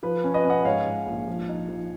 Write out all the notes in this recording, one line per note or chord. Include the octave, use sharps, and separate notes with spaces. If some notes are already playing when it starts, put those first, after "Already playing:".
F3 B4
C#4
B4 D#5
C#4 D#5 F#5
G#2 C#5 F5
G#2
A#1
F3
D#4
F3